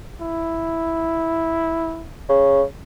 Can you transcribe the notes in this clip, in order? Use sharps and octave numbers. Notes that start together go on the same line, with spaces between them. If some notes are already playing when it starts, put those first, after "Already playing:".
E4
C#3